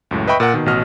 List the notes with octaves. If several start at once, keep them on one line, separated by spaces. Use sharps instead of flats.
C#2 F#2 A2
B4 D#5 E5 G5 B5 C#6
A#2 A#4 F#5
B2 D#3
A1 B2 F#4 D#5 F6